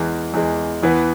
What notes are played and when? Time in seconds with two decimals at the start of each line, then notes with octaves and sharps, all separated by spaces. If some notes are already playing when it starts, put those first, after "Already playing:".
Already playing: E2 E3 G#3
0.34 E2 E3 G#3
0.83 E2 E3 B3